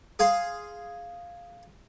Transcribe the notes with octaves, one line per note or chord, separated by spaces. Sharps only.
G#4 F5 G#5 C6